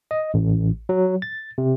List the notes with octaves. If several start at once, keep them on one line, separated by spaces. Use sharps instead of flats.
D#5
A1
F#3
A6
C3